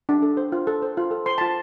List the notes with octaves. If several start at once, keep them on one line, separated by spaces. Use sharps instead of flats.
D4
A4
C5
F4
A4
C5
F4
A4
C5 C6
F4 A5